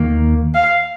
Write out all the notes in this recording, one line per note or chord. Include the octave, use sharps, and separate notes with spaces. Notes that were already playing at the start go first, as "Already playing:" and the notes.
Already playing: D#2 D#3 A#3
F5